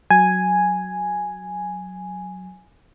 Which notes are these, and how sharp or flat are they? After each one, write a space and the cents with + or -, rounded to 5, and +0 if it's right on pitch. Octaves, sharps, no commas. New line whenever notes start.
F#3 +0 G#5 +0